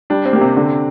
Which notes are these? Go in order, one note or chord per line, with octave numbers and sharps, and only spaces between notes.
G3 D4
C4
A#3 G4
C3
D3